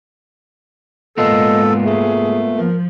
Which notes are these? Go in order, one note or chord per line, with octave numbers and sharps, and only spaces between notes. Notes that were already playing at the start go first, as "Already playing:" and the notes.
G#2 A#3 B3 F4 A4 D#5
A3 G#4
F3 A#4